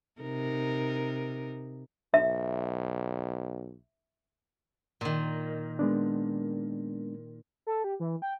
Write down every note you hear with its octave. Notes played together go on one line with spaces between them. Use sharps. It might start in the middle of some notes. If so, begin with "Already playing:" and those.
C3 D#4 A#4
B1 E5
A#2 D#3
G#3 B3 D4
A4
G4
E3
G5